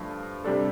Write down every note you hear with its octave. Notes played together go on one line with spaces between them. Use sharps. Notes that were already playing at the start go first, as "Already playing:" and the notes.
Already playing: G2 F3 A3 D4
C3 G3 D4 A4